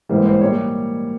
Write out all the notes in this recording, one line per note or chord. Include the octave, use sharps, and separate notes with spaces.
G#2 E3 G3 A#3 C5
C5
A#2 G3 A#3 C#5
G4